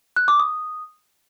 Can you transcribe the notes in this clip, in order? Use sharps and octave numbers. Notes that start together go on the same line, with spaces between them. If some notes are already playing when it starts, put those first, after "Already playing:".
F#6
D6
D#6